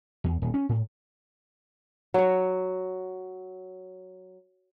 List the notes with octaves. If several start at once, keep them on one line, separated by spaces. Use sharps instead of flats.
E2
D#1
C#4
A2
F#3 C#5